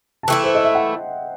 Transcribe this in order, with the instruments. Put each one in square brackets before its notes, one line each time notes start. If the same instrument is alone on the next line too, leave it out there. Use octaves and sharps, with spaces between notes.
[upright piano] A5
[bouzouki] E3 A3 E4 [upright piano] G5
[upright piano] C5
D#5
E5
F#5